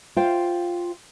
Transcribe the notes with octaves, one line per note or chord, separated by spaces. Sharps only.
F4 C5 F5 G5